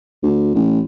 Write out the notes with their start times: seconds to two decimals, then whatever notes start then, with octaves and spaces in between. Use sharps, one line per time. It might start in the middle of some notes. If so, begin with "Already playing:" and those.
0.23 D2
0.55 A1